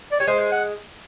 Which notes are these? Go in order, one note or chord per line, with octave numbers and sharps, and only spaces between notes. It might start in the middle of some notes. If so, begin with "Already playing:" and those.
D5
G3 C#5
G#3 C5
C5
F#5